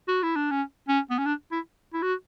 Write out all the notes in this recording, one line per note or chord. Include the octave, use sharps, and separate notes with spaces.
F#4
E4
D4
C#4
C#4
B3
C#4
D4
E4
E4
F#4